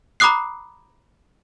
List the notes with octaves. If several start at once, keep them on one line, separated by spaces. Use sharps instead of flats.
A#5 B5 D6 D#6 F#6 C7